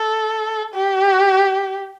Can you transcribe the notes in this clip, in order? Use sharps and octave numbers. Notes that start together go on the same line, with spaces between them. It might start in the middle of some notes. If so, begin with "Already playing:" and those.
Already playing: A4
G4